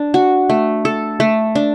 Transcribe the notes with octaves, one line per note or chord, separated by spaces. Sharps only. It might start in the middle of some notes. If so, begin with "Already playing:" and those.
Already playing: D4
F#4
A3
A4
A3
D4